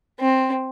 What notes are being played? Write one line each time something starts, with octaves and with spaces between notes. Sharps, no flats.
C4